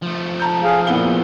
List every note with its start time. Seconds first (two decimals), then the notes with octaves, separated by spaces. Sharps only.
0.02 F3 A3
0.40 A5 A#5 G6
0.64 G#4 F5
0.87 A#2 B3 E4 G7